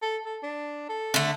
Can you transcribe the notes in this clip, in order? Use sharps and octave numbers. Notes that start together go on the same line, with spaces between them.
A4
A4
D4
A4
D3 A3